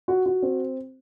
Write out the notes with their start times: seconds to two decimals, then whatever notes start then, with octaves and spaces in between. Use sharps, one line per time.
0.08 F#4
0.26 F#4
0.42 C4